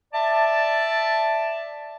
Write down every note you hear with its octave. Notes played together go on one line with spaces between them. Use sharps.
D5 E5 A5